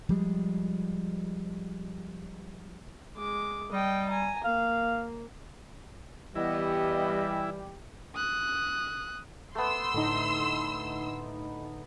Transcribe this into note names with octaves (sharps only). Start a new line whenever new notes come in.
F3 G3 G#3
G#3 D6
G3 D#5 G5
G#5 A#5
A#3 F5
E3 G3 B3 E4 G4 D#5
D#6 F#6
A3 B3 C6 E6
A2 D3 D#4